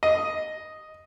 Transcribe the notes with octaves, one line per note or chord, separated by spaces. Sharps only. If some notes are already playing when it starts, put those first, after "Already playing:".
D#5